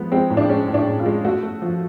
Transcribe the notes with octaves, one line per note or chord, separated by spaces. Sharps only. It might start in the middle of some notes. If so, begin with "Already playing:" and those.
Already playing: F3 G#3 B3
G#3 C4
A2
D4
G#3 C#4
A2
D4
A2
F4
G#3
A3 F#4
A3
F3